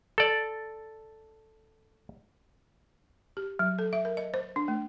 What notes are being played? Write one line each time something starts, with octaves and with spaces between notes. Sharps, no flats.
A4 D5
G4
F#3
A4
E5
A#4
D#5
C5
D4
A3